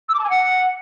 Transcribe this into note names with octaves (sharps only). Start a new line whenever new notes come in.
E6
D6
A5
G#5
F#5